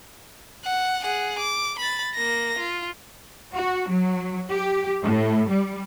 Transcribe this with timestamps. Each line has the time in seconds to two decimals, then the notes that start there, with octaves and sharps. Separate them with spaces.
0.64 F#5
1.03 G#4 F#5
1.39 D6
1.79 B5 A6
2.15 A#3 A#6
2.59 F4
3.54 F#4
3.90 F#3
4.50 G4
5.02 A2
5.48 G3